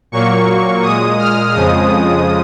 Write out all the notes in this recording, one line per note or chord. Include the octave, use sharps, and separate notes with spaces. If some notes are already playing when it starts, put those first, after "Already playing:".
A#2 F#3 A#3 C#6
A#2 G#3 D#6
F6
F2 C#3 F3 G#3 D#6